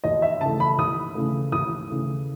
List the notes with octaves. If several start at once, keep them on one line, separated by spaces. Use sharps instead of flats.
D#2 D#5
E5
C#3 E3 A3 A5
B5
D#2 D#6
C#3 E3 A3
D#2 D#6
C#3 E3 A3